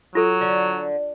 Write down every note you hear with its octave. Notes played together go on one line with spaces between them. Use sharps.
F#3 F4 A4
D3